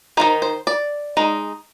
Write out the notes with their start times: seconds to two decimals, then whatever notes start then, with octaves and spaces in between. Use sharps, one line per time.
0.17 D#3 A#3 D#4 C5
0.42 C5
0.67 D5
1.17 G#3 D#4